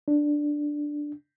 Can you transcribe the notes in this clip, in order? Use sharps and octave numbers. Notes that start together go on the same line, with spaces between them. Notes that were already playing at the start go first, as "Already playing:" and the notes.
D4